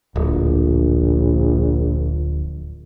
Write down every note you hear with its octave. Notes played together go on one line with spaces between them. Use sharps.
D1 A#1